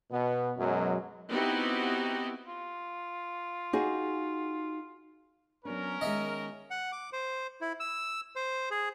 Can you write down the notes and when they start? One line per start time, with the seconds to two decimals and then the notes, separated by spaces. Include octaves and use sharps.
0.11 B2 B3
0.58 F#2 B2 F#3 G#3
1.29 B3 C4 D#4 E4 F#4 G4
2.47 F4
3.73 D#4 F#4 G#4
5.65 F#3 B3 C#4 D4 A#4
6.01 D#3 G#3 D#5 E5
6.70 F#5
6.92 D6
7.13 C5
7.61 E4
7.80 E6
8.36 C5
8.71 G#4